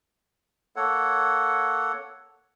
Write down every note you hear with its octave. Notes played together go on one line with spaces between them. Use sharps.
A#3 A4 C#5 F#5